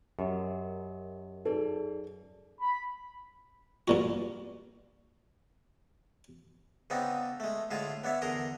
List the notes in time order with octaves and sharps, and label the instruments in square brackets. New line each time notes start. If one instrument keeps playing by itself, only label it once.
[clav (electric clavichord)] F#2 [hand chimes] G4 A#4 D#5
[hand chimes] D#4 G#4 D5 [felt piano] A4
[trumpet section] B5
[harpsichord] G2 A#2 F#4
C#3 B3 C4 D4 D#4
G#3 A3
A2 D3 G#3 F4 G#4 F5
B3 D4 C#5 E5
E2 D3 G#4 A#4 C6 D#6